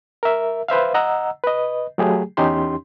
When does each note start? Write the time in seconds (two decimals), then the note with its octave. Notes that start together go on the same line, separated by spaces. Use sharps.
0.23 A#4 E5
0.68 B4 C5 E5 F5
0.94 D#5 F#5 A#5 E6
1.44 B4 D#5
1.98 F#3 A3 G4 G#4
2.37 E2 C#4 D#4 G4 C6